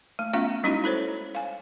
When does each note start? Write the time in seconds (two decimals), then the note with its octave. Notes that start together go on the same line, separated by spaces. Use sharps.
0.19 A3
0.33 A3 B3 C#4 F4 E5 F5
0.63 G3 G#3 C#4 D#4 E4 F#4
0.84 E4 A4 C5 C#5
1.35 F5 G#5